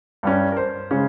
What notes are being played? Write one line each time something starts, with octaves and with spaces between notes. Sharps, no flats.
G2 G3 C#4
A#4
C5
C#3 G#3 C#4